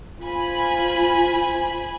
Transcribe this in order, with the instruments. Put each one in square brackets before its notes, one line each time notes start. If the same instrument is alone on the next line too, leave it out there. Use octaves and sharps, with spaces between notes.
[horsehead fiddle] F4 [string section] C5 G#5 B5